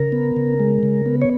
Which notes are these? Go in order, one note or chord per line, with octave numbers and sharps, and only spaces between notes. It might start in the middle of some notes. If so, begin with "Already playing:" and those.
Already playing: C#3 A#4
B3
C#3
G#3
C#3
B3
C#5